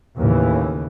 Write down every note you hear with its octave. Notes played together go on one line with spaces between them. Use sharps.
D#2 A2 C#3 E3